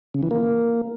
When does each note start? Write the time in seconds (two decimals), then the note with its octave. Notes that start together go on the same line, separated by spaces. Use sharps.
0.14 C#3
0.23 E3
0.31 A#3